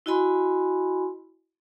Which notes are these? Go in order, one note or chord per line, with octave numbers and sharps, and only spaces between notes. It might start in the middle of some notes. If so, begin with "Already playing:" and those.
E4 F#4 D#5 G#5 B5 C6